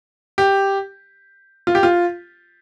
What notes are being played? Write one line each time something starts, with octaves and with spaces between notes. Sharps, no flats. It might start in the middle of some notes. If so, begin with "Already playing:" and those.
G4
F4
G4
F4